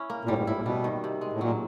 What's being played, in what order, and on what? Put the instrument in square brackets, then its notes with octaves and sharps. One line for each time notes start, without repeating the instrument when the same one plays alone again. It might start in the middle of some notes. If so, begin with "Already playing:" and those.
Already playing: [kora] C#4 E4
A#3
[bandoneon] A#2
[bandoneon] A2 [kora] G3
[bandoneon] G#2
[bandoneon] A2 [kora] E4
[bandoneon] A#2
[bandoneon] B2 [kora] G3
[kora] D#3
C3
G#3
[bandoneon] A2
[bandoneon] A#2 [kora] F#3